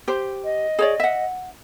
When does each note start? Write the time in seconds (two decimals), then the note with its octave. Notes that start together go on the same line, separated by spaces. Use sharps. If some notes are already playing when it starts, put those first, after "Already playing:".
0.08 G4 C5
0.44 D#5
0.79 G#4 C#5 D5
1.00 E5 F#5